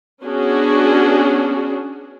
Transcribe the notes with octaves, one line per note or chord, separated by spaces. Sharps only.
B3 C#4 D4 F#4 G#4